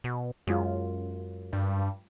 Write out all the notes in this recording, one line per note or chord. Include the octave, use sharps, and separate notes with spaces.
B2
F#2 F#3 G#3 F4
G2